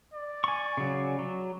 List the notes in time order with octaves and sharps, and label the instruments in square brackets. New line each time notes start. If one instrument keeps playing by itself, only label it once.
[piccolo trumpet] D5
[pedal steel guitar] G#5 C#6
C#3 F#3
F#3